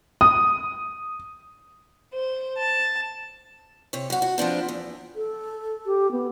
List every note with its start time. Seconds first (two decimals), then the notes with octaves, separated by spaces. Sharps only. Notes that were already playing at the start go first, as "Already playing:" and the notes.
0.21 D#6
2.12 C5
2.58 A5
3.93 C3 C#5
4.10 F#2 F#4
4.22 F#4
4.38 F3 B3 C4 D4
4.69 E2
5.16 A4
5.86 G4
6.12 B3